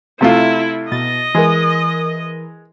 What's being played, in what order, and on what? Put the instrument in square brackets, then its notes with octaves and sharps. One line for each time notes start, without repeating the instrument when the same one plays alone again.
[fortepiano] C3 A3 F4 [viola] E4
[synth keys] B2 A6 [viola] D#5
[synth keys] E3 A#4 [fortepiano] G#3